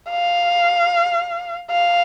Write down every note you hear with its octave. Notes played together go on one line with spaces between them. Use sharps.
F5
F5